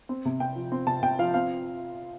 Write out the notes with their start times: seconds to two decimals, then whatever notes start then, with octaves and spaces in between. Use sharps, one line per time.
0.09 C4
0.25 C3
0.40 C3 G5
0.56 F3
0.72 C4
0.87 C3 A5
1.03 C3 G5
1.19 F3 F5
1.34 C4 F5